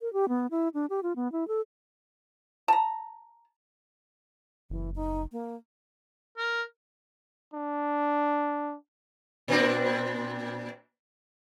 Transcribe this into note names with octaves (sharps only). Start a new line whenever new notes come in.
A#4
G4
B3
E4
D4
G4
F4
B3
E4
A4
A5 A#5
F#1 E3
D#4
A#3
A#4
D4
A#2 C4 D4